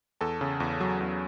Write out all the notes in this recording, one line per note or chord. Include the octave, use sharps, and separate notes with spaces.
E2 A4 A5
C#3
E2
F#3
E2